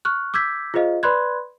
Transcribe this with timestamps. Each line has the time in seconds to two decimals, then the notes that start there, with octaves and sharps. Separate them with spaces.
0.05 C#6 F6 F#6
0.34 D6 E6 G6 G#6 B6
0.74 F4 G#4 C5 D#5 F5
1.03 B4 D5 B5 C6 F#6 G#6